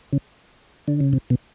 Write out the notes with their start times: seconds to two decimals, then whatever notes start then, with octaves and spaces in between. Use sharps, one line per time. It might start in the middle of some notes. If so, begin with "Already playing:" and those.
0.13 C#3
0.88 D3
1.00 C#3
1.13 C3
1.30 B2